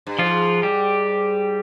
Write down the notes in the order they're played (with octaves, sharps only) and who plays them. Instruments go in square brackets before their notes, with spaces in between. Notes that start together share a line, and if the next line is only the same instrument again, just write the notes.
[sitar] G2
[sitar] G#2 [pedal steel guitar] F3 F4
[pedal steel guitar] G3 G4